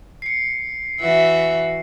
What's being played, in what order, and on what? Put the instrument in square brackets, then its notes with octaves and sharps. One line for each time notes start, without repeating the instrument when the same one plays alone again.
[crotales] C7 C#7
[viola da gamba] E3 F#4 [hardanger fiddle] E5